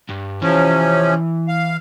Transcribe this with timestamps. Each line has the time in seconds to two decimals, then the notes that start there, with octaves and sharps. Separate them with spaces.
0.10 G2
0.42 C3 E3 F3 C#4
1.48 F5